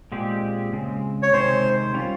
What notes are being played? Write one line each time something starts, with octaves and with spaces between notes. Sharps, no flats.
A#2 G#3 C4 G4
C#3 G#3 C4
C#5
C3 D#3 G#3 C4 G4 C5
G3 C#4 F4